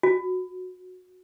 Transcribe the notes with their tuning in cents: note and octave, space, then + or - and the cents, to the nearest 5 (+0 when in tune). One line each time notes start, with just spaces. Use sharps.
F#4 -15